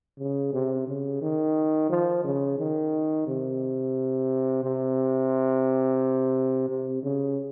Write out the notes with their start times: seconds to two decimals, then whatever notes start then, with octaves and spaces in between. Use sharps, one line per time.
0.19 C#3
0.53 C3
0.87 C#3
1.22 D#3
1.90 F3
2.24 C#3
2.58 D#3
3.27 C3
4.63 C3
6.69 C3
7.03 C#3